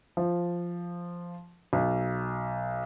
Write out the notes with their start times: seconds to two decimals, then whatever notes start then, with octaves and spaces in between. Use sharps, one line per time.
0.17 F3
1.73 B1